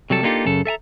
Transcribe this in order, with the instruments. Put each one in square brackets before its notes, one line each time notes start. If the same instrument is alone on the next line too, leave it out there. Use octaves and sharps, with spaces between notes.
[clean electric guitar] C3 F#3 G3 A4
A#3 D4 D#4 F4 G4 A4
F#2 C#3 A4
A4 E5 G#5 A#5